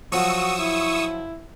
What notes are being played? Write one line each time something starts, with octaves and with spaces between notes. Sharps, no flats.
F3 F#3 F#4 C#6 D#6 E6
E4